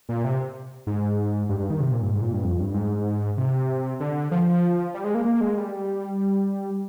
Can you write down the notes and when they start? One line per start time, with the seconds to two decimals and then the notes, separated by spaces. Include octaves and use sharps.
0.09 A#2
0.24 C3
0.87 G#2
1.49 G2
1.60 G2
1.70 D#3
1.80 C3
1.91 A#2
2.02 G2
2.12 G#2
2.22 A#2
2.33 G2
2.43 F2
2.60 G2
2.74 G#2
3.38 C3
4.00 D3
4.31 F3
4.94 G3
5.04 G#3
5.15 A#3
5.25 A#3
5.41 G#3
5.57 G3